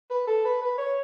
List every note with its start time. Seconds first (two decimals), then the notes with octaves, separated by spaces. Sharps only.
0.10 B4
0.27 A4
0.45 B4
0.62 B4
0.78 C#5